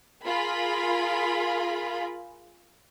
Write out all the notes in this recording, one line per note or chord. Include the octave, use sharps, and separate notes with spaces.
F4 G#4 A#4 B5